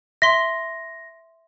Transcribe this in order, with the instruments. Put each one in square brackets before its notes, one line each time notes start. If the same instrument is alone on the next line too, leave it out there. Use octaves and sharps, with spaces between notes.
[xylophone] E5 C6 [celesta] A#6